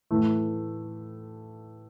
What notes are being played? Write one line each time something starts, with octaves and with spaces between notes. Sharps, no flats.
A2 E3 A3